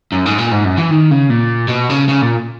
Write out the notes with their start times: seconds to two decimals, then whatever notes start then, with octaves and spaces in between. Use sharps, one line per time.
0.12 F#2
0.26 G#2
0.38 A#2
0.52 G#2
0.65 F#2
0.78 E3
0.90 D#3
1.11 C#3
1.30 A#2
1.69 B2
1.90 C#3
2.09 C#3
2.22 A#2